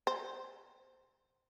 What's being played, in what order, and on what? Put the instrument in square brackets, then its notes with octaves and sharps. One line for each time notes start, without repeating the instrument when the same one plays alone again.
[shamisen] C5